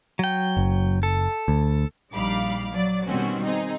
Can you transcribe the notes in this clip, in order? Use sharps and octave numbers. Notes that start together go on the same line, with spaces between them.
F#3 G5
F#1
A4
D2
A#1 G3 D#4 F5 B5 D6
F#3 D5
B2 D#3 G3 C4 C#4 F#4
C4 D#4 G#4